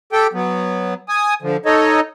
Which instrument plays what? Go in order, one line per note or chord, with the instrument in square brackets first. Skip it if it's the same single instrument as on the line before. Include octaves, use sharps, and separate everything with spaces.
[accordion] G4 A4 G5
F#3 B3
G#5 D#6
D3 F3
D#4 A4 C#5 D#5